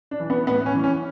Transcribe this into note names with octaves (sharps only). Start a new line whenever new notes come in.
D4
E3
B3
A2 B3
C#4
E3
C#4